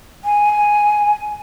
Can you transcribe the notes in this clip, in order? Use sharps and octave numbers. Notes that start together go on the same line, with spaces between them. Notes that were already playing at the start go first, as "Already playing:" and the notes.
G#5